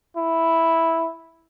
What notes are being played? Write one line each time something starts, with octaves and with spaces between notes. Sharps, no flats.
E4